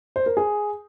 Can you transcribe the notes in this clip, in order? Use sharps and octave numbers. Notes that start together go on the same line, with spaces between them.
C5
A#4
G#4